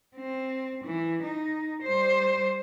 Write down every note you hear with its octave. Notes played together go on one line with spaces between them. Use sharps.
C4
E3
D#4
G3 C5